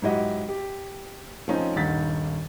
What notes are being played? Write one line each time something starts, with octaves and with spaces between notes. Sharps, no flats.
G#2 F#3 E4 G4 D#5 F#5
G4
F3 A3 C4 C#4 D#4
D#1 G2 D#3 F#5 A6 B6